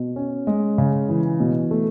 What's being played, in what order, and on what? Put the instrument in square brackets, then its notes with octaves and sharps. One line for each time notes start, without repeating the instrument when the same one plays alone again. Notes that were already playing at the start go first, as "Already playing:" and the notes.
Already playing: [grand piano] B2
C#4
G#3
C#3
E3
B2
A3